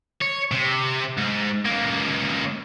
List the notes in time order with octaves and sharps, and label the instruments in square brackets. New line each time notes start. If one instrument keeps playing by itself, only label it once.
[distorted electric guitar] C#5
C3
G#2
C#2 A#3